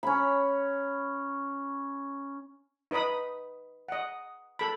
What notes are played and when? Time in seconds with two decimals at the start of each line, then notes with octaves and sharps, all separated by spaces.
0.03 C#4 B5
2.91 D#4 B4 D#5 B5 D#6
3.89 D#5 F#5
4.59 A4 B5